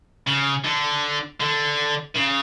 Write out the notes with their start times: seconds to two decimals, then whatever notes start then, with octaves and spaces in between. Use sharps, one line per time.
0.27 C#3
0.64 D3
1.41 D3
2.15 C#3